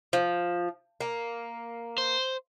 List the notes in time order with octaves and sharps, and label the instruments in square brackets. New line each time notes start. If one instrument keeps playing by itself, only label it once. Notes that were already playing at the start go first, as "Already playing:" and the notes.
[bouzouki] F3
A#3
[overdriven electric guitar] C5